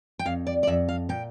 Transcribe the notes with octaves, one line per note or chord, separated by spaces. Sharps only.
G5
F2 F5
D5
D5
F2 E5
F5
A#2 G5